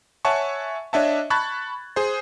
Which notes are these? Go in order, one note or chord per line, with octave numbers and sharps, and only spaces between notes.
C#5 E5 F#5 G#5 A5 C#6
D4 C#5 D#5 E5 F#5 A5
A5 B5 C#6 F#6 G#6 A6
G#4 C5